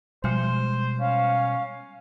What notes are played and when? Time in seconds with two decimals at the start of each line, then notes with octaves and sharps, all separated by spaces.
0.24 B2 F3 G3 G#3 C5 G#5
1.00 C#4 F5